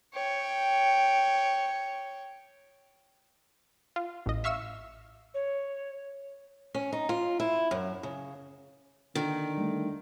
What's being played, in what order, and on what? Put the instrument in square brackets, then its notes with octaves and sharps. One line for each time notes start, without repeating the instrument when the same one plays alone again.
[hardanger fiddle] C#5 G5
[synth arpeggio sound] F4
A1 D#5
E5 F5 C#6 E6 F6 E7
[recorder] C#5
[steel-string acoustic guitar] C#4
D#4
F4
E4
F#2
C#3
[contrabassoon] D3 [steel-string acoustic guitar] D#3
[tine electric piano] G3 A3